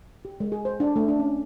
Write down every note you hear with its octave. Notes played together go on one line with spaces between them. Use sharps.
G4
G#3
G#4
C5
D4
A3
D4
C#4